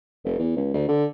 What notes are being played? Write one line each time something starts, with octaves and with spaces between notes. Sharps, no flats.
F1
E2
C#2
D2
D3